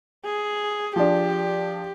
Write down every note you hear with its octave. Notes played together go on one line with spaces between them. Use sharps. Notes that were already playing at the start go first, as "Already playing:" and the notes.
G#4
F3 D4 G4